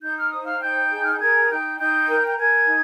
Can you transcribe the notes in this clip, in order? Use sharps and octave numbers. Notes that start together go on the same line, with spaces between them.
D#4 G6
F6
C5 D#6
F5 F6
D#4 G5 G6
G#4
F6
G6
A#4 G#5 G#6
D#4 G5 G6
D#4 G5 G6
A#4
G6
A#4 G#5 G#6
D#4